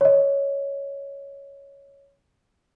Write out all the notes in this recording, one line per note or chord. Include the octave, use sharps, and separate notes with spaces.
C#5 D#5